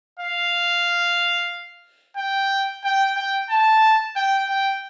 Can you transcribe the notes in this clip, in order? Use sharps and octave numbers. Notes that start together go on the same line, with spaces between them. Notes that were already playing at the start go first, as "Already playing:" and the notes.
F5
G5
G5
G5
A5
G5
G5